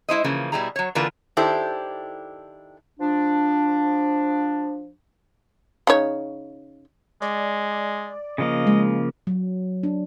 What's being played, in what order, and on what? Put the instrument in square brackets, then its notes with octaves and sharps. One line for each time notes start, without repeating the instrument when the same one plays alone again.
[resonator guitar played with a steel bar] G#3 E4 C5 D#5
C#3 E3 F3 A#3
B2 G3 G#3 E4 G#4 A#5
F#3 C#5
D3 E3 A#3 F4 A#4 B4
D#3 D4 E4 G4 A4 C5
[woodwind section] F3 D4
[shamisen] C#3 D#4 C#5
[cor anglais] G#3 [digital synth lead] D5
[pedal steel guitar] C#3 F3 A#3 [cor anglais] D#5
[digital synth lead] G#3
[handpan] F#3
D4